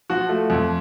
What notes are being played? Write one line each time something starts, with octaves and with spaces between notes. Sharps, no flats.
F3 F#4
A3
F2